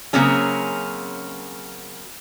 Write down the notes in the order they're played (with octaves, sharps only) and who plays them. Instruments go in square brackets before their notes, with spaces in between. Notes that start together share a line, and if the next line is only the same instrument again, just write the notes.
[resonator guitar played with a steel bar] C#3 F#3 A#3 C4 C#4 G#4